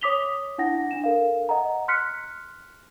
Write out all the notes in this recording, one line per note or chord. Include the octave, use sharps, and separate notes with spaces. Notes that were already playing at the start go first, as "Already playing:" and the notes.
C#5 D6 D#6 B6 F7 G7
D4 E4 F#5 A#6
D4 E7
A4 A#4 F5
D#5 F#5 A#5
C6 F6 F#6 B6 C#7